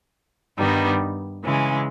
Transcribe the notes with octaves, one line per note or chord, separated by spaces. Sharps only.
G2 D#3 G3 B3 D#4
C#3 E3 G#3